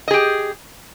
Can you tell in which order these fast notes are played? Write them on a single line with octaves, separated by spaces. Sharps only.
D#5 G#4 G4